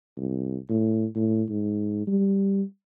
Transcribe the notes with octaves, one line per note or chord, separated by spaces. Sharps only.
C2
A2
A2
G#2
G3